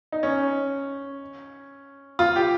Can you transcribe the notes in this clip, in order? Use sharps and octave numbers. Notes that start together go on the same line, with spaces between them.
D#4
C#4
F4
G4